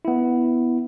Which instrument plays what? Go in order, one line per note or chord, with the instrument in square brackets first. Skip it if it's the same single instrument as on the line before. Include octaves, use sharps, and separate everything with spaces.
[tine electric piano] B3 E4